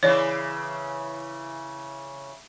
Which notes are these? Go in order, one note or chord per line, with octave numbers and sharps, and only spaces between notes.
C#3 E3 C#5 D5